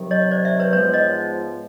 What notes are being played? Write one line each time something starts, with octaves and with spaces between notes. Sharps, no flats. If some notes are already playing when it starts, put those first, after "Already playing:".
Already playing: C3 D#3 F#3
C#5 D#5
C5 D5
D5 E5
B4 C#5
G#2 F3 G#3 B3 B4 C#5
C#5 D#5